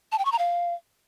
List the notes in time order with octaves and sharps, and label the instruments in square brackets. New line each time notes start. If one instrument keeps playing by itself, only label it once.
[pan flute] A5
G5
C#6
A#5
F5